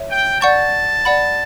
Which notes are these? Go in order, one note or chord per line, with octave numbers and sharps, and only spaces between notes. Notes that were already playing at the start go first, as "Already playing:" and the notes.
Already playing: C#5 E5
G5
D5 F#5 A5 C#6 G6
D5 F#5 B5